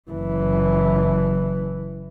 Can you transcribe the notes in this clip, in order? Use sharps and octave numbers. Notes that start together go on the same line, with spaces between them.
F#1 E3